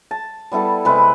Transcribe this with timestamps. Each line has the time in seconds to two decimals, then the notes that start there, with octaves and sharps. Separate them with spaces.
0.11 A5
0.52 G3 B3 E4 A4
0.85 C3 G#3 C4 B4